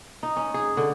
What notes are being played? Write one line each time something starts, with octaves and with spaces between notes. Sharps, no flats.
D#4
C#4
G#4
D3